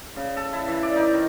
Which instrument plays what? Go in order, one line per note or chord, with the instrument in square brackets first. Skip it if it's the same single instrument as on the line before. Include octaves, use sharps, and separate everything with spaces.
[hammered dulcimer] C#3
A4
E4
E3
D5
D#4
D#3